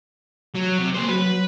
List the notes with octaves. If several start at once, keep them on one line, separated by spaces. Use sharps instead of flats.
F#3
C3
A#3 C5
F#3 B4